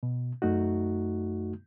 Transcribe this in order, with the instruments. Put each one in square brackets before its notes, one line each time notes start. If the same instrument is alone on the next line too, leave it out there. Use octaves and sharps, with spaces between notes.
[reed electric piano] B2
F#2 A3 D#4 F#4